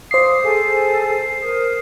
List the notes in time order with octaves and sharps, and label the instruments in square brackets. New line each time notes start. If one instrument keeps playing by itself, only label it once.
[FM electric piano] C5 C7 [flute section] F5 D6 D#6
[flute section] G#4 A4 G#5
A#4 D#6